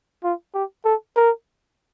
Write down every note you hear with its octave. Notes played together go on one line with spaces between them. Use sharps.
F4
G4
A4
A#4